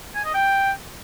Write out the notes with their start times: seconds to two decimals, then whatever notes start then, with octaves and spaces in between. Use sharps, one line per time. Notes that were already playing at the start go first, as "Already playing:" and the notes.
0.16 G#5
0.25 D#5
0.34 G5